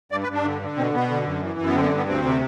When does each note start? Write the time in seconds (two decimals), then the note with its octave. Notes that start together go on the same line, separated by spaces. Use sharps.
0.12 G2 D5
0.23 B4
0.28 G2 D4
0.44 D3
0.62 D3
0.77 B2 C4
0.94 B2 B3
1.10 D3
1.26 F#2
1.43 E3
1.59 F#2
1.66 B3
1.75 D3 C4
1.82 B3
1.87 C4
1.92 G2
1.97 B3
2.08 D2 C4
2.25 C3